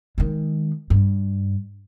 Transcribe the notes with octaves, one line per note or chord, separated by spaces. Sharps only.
D#3 G#3
G2